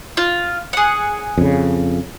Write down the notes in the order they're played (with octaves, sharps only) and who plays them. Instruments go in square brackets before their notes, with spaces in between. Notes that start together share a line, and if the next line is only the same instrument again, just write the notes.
[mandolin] F4
G#4 F#5
[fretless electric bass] F2 C#3